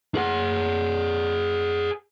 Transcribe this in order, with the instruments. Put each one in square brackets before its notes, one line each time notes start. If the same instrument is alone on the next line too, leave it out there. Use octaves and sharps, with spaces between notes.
[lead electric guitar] G#4 F#5